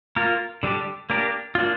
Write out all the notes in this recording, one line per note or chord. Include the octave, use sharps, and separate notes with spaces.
A#3 F4 A#4
D3 G3 D4 G4
A#3 D4 G4 A#4
A#3 D4 F4